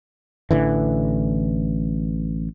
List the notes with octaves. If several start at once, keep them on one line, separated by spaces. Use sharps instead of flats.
A1 D3 E3